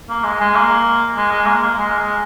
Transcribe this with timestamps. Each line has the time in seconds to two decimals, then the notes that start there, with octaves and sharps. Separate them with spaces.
0.10 A#3
0.24 G#3
0.40 G#3
0.55 A#3
1.16 G#3
1.32 G#3
1.46 A#3
1.62 A#3
1.78 G#3
1.98 G#3